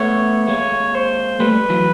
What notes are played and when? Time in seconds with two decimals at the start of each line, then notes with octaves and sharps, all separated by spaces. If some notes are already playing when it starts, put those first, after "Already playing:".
Already playing: A3 B3 C#5
0.47 G#3 A#3 C#5
0.94 C5
1.40 G3 A3 B4
1.70 E3 F#3